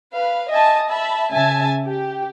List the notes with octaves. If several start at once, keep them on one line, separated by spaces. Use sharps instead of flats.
B4 F5
D#5 E5 G#5 A5
E5 A5 B5
C#3 E5 G#5 A5
G4